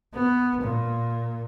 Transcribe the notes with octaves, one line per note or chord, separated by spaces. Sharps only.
B3
A#2